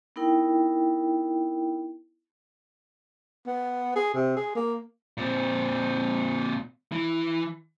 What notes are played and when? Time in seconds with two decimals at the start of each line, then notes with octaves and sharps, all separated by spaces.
0.16 B3 D#4 E4 A#4 G5
3.46 B3
3.96 G#4
4.14 C3
4.36 G#4
4.55 A#3
5.17 A#2 C4
6.92 E3